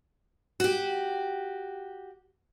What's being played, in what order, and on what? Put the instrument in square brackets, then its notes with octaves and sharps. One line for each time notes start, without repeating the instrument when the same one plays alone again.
[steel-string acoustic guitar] F#4 G4